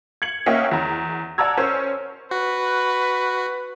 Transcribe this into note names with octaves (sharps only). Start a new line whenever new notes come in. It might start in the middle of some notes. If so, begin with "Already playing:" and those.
G#6 C#7 F#7
A#3 C#4 D#5 E5 F#5 G5
E2 A#5
D5 F#5 A5 A#5 E6 G#6
C#4 A#4 C5
F#4 B4